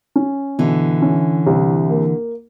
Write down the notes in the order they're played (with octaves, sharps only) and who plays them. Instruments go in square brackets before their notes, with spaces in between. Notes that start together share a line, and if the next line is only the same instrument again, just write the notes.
[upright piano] C#4
[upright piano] B2 [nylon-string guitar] D3 E3
[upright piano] C#4
C2
A#3